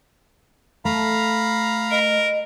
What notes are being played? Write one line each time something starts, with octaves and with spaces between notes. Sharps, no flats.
A3 F5 A#5 B5
A#4 D#5